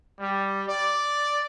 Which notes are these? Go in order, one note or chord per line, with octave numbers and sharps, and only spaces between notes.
G3
D5